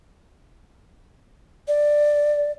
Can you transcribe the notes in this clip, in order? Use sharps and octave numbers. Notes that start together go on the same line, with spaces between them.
D5